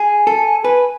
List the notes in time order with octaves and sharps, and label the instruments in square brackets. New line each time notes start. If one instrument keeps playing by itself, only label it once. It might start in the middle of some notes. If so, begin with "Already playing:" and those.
Already playing: [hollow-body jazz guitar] G#4 [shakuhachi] G#5
[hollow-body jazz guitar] A4
[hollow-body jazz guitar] B4 [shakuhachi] G#5